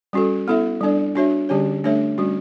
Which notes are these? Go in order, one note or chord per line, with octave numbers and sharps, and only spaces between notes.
G3 C#4 F#4 A4
B3 E4 A4 E5
G3 D4 A4 D5
D4 F#4 C#5 E5
D3 G3 C#4 G4 C#5
A3 D4 A4 C#5 E5
G3 C#4 F#4